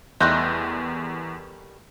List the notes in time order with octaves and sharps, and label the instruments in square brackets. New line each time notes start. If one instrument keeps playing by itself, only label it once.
[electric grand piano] E2 G6 [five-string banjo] D#3 G3 A3 [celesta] C6 F#6 A#6